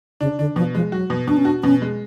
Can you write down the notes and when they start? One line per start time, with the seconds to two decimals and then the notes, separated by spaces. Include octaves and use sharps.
0.21 C#3 D4
0.39 D3 D4
0.56 B2 F3
0.75 F3 G#3
0.92 F#3 F#4
1.10 B2
1.27 B2 D4
1.37 C#4
1.45 D4 F#4
1.63 B2 C#4
1.82 G#3